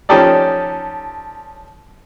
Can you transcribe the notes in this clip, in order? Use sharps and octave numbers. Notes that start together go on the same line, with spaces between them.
F3 C#4 D#4 G4 A4 D5